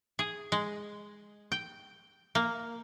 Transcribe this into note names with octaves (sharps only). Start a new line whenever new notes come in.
G#4
G#3
G5
A#3